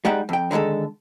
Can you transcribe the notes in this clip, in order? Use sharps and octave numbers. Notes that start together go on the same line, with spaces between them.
G3 G#3 D#4 F#5 G5
F2 G5
D3 D#3 F3 G#3 A4